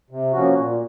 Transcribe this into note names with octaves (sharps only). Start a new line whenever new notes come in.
C3
F3 A#3 C#4 F#4
A#2